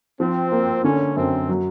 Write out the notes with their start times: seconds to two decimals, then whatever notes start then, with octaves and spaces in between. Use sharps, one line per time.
0.19 F3 C4
0.52 A#3
0.84 D3 C#4
1.16 F#2 C4
1.49 F#3